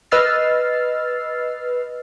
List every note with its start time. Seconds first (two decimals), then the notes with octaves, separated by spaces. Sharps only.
0.11 B4 D#5 E6 F6 A6 C7